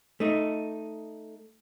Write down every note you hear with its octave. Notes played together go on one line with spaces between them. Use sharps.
A3 D#4